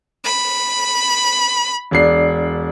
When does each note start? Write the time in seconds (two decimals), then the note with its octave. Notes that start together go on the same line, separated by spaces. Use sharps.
0.24 B5
1.91 E1 D4 C7